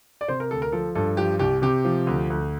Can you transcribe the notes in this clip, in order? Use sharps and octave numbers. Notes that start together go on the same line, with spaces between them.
D5
C3 C5
A#4
D2 A4
A#4
F3 A4
G2 A4
F3 G4
C2 G4
C3 G4
F3
D2
D2